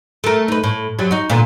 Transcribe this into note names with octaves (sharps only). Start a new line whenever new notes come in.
A3 A#4
D#4 B4
A2
F#2 F#3 G3
D#4 F#4
A#2 D3 B3